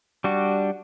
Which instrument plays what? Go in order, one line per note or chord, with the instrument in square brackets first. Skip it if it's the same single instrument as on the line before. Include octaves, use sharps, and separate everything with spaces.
[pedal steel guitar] G3 D4 F#4